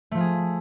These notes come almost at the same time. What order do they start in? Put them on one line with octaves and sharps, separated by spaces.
A3 F3 F4 G#4